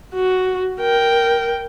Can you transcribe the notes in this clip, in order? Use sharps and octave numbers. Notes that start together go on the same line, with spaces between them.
F#4
A#4 G5